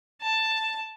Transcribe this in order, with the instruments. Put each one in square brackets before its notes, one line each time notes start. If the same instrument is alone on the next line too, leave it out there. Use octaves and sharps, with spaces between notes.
[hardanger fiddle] A5